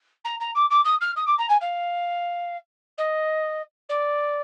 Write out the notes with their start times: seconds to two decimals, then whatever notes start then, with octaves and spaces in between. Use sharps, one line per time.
0.24 A#5
0.40 A#5
0.55 D6
0.70 D6
0.85 D#6
1.01 F6
1.16 D#6
1.27 D6
1.38 A#5
1.49 G#5
1.61 F5
2.98 D#5
3.89 D5